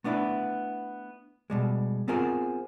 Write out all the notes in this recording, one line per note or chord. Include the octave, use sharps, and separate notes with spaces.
A3 B3 D4 E4 B4
B2 G3 G#3
B3 C4 F4 G#4 A#4 C5